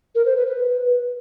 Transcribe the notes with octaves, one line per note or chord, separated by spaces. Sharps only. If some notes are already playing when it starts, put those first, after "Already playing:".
A#4
C5
B4
B4